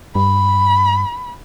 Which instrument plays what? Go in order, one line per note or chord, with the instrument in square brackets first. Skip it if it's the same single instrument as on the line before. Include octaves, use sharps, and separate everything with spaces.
[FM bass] G2 [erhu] B5